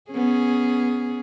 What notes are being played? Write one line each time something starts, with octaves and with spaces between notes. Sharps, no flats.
B3 C#4 G#4